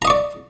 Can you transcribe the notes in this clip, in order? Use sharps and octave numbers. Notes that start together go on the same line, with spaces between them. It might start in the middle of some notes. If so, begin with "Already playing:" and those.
D5 D#5 A#5 C#6